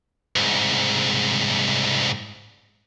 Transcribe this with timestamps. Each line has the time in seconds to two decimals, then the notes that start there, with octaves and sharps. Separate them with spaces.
0.36 C2 G#2